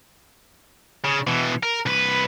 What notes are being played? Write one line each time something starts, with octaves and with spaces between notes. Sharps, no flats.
C#3
B2 E3
A#4
C2 B4